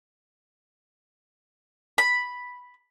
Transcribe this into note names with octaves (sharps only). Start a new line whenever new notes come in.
B5